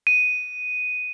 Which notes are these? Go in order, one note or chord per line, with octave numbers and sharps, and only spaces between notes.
D#7